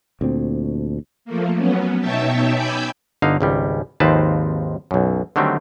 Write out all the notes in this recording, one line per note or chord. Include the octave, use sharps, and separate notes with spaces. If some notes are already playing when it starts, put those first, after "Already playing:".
D2 A#2 C4
F3 A3 A#3
F#3 B3 C#4
B2 D#4 C#5 E5 G5 A5
G5 G#5 B5 D6 E6 G6
G1 D3 D#4 F5
G#1 C#2 G3
G#1 D#2 F3 C4 B4 A5
B1 F#2
D3 D#3 F#3 G3 A3 C4